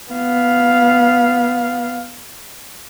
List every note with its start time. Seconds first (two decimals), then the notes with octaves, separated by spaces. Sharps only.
0.11 B3 F5